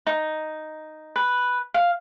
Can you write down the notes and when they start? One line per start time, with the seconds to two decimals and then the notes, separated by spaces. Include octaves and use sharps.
0.07 D#4
1.16 B4
1.74 F5